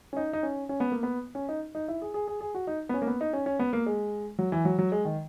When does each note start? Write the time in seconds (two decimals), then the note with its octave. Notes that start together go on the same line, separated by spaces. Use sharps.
0.13 C#4
0.17 D#4
0.33 D#4
0.43 C#4
0.69 C#4
0.80 B3
0.92 A#3
1.03 B3
1.35 C#4
1.49 D#4
1.75 D#4
1.88 E4
2.02 G#4
2.14 G#4
2.27 G#4
2.41 G#4
2.55 F#4
2.67 D#4
2.89 B3
2.94 C#4
3.02 A#3
3.07 B3
3.21 D#4
3.33 C#4
3.46 C#4
3.59 B3
3.73 A#3
3.86 G#3
4.39 F#3
4.52 E3
4.65 F#3
4.79 F#3
4.92 G#3
5.05 D#3